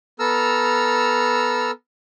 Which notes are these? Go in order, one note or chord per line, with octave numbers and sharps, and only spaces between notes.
B3 A4 A#5 E6 F6